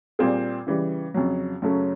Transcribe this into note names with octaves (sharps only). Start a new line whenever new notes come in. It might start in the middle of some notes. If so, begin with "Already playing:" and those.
A#2 G3 C4 F4 G#4
C#3 E3 G3
F2 C#3 F#3
F#2 C#3 F#3 A3 C#4